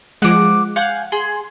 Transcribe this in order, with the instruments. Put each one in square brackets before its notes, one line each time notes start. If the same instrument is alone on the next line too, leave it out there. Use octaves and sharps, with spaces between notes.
[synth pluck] F3 G#3 [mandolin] F#5 D6
[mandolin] F5 G#5 G6 [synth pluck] F#5
[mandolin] G#4 [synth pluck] C6